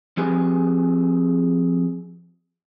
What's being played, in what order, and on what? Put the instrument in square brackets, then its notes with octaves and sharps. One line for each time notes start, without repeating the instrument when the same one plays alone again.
[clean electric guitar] F3 C4 G4 G#4 B4 G#5